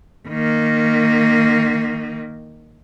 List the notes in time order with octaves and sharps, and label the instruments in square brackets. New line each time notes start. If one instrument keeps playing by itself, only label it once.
[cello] D#3 A#3